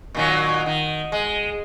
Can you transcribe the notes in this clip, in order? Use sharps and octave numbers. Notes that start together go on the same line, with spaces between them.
A#2 D#3 F#3
D#3
G#3